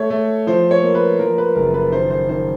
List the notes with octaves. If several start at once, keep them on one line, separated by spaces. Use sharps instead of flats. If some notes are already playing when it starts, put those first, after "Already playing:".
Already playing: A3 C#5
A3
F3 C5
C#5
A#3
B4
F3 A#4
B4
F#1 A#4
B4
D#3 C5
C5
D#3 C5